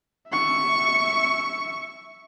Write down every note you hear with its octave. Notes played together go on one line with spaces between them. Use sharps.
E5 C#6